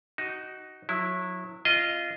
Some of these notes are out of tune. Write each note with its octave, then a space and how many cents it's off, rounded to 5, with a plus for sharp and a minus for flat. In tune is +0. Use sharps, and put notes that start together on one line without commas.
D#4 +0 F#4 +15
F#3 -25 E4 +0
C4 +5 F4 -20 D#5 +0